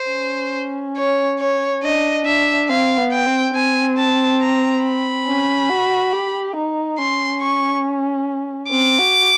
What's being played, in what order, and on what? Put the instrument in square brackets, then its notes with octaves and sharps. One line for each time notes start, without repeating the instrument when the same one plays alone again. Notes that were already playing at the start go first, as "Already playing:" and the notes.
Already playing: [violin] C5
[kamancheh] C#4
[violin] C#5
C#5
[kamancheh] D4 [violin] D#5
[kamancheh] D4 [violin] E5
[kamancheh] C4 [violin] F5
[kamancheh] B3
[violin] G5
[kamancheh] C4
[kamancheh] C4 [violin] G#5
[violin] A5
A#5
B5
[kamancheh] C#4
F#4
G4
D#4
[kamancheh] C#4 [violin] C6
[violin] C#6
[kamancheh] C4 [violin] D6
[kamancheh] F#4